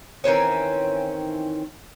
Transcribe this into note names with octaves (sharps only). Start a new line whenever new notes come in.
D#3 E3 C4 C#4